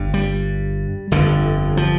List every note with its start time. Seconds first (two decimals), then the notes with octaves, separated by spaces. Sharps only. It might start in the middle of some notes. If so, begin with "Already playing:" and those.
Already playing: G1 G2
0.14 G3
1.11 G1 F2 D3
1.77 F3